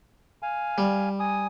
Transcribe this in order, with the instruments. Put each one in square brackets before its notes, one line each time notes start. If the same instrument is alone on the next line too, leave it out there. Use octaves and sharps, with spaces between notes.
[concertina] F5 G#5
[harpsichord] G3
[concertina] G#5 D#6